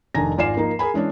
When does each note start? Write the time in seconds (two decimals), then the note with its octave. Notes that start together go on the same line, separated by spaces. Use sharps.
0.14 F1 D#3 D4 G#5 A#5 A#6
0.38 G#1 F4 D5 G#5 C7 E7
0.56 F3 A#3 D#4
0.79 G#4 A#4 G#5 B5
0.94 E3 G#3 C#4 D4